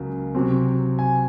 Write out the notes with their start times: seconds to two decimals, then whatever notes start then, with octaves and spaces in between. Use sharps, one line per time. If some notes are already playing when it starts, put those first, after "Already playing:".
Already playing: C#2 C#3 F#3 A#3
0.35 C3 F#3 C4
0.99 G#5